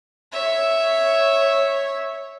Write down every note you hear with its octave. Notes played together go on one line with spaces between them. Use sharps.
C#5 E5